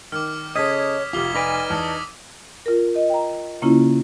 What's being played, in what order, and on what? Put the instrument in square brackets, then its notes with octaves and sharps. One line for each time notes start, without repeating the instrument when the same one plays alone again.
[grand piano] D#3 [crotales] D6 F6
[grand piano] C#3 [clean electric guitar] A4 D#5 [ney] C#5 [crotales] D#6 G#6 B6
[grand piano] F1 F5 [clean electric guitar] F4 [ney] G4 [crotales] D6 G7
[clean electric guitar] D#4 B4 D5 [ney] G#5 [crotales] D6 A#6 D#7
[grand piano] E2 [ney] A5 [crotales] D#6 E6
[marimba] F4 A#4
D#5
G5 A#5
C#3 A#3 C#4 E4 F4